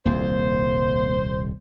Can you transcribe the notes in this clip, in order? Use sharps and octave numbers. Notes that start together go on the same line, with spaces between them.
D#1 C2 F2 A#3 C5